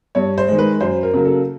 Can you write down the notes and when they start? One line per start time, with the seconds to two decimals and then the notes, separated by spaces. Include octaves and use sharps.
0.15 G2 C#5
0.38 C5
0.48 D#3 G#3
0.58 B4
0.80 F#2 C5
1.03 A#4
1.14 C#3 F#3 A#3
1.25 A4